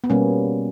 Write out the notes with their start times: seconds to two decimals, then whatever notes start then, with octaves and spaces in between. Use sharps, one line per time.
0.04 B3
0.10 B2 G3 A#3 C#4